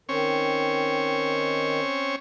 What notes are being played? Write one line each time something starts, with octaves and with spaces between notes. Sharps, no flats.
D#3 C4 C#4 C#5